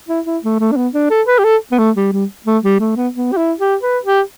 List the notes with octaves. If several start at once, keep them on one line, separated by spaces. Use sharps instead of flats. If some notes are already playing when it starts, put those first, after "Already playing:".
E4
E4
A3
A3
D4
B3
D4
A4
B4
G4
A4
B3
A3
G3
G3
A3
G3
A3
B3
B3
G4
E4
G4
B4
G4